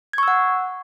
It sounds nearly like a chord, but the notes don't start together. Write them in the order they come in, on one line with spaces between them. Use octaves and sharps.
G#6 C#6 E6 F#5